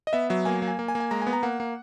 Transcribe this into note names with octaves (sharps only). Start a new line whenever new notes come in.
D#5
B3 E5
F#3 E5
A#3 G#5
A#3
G#5
A#3
G#5
A#3
G#5
G#3 A#5
G#5
B3
A#5
A#3 F#5
A#3